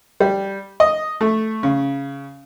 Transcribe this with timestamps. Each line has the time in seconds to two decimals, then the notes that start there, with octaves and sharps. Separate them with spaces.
0.20 G3
0.80 D#5
1.21 A3
1.63 C#3